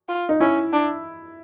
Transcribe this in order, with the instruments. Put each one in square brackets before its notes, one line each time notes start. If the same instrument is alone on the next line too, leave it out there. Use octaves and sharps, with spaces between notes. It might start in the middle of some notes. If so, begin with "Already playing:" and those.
[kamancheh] F4
[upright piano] D#4
[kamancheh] C#4 [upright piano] E4
[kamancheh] D4